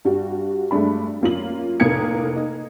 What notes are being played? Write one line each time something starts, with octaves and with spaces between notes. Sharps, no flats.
G2 G3 F#4
G2 G#3 A3 D4 B5
F#2 A#3 F4 F#7
F1 A2 A#3 D#6 G#6 C#7
D#4